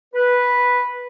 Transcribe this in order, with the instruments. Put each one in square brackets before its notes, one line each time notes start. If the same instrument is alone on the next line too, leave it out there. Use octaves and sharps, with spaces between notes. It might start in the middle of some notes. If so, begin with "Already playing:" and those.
[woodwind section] B4